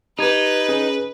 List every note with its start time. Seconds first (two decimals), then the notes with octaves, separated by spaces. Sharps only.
0.18 D#4 G4 B4 G#6
0.69 C#4 G#4